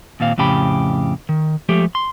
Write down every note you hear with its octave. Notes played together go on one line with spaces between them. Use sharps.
D#2 A#2 C4 F5
F2 A2 C#3 G4 B5
D#3
F3 G#3 A3 G4
C6